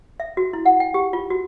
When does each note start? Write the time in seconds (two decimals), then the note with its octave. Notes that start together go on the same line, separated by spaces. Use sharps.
0.20 E5
0.37 F#4
0.53 E4
0.66 F#5
0.80 G5
0.94 G4
1.13 F4
1.30 F#4